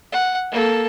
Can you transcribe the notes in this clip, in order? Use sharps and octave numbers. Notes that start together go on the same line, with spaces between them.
F#5
A#3 A4